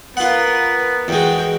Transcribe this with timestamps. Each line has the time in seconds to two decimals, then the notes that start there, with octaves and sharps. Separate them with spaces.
0.17 B3 F4 A#4 B4 F#5
1.08 E2 G#3 F#4 G5